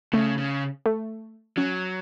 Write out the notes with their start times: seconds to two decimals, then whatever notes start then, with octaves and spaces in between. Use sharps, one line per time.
0.13 C#3 A3
0.38 C#3
0.86 A3
1.57 F#3 C#4